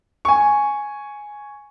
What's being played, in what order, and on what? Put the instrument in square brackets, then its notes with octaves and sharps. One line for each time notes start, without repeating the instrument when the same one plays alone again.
[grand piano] G#5 C#6